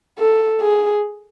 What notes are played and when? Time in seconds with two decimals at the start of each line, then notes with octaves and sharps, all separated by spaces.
0.19 A4
0.61 G#4